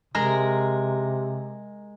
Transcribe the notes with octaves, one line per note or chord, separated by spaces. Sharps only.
C3 G#3 A#4